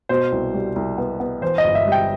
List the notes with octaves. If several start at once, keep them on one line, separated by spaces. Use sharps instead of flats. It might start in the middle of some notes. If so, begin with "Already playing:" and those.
B2 C5
C2
G3
C2
B3
B3
E3 C5
D#5
G1
E5
G3
G5